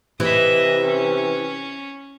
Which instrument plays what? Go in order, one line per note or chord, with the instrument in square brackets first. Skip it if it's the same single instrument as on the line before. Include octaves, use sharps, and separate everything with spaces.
[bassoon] C3 [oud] E3 [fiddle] D#5 E5
[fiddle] C#4